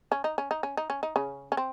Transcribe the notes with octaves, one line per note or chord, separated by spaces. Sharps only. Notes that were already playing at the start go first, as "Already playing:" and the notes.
C#4
D#4
C#4
D#4
C#4
D#4
C#4
D#4
C#3 C#4
C#4
C4